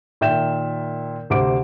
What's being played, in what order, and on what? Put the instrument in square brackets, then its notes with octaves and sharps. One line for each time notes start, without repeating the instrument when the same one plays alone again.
[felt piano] A#2 D#3 E5 G5 G6 E7
D2 C3 C5 D6 D7